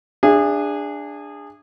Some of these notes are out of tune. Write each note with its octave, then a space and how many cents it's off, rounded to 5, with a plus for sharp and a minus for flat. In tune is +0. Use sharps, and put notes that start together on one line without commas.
D4 +5 G#4 -25 E5 +40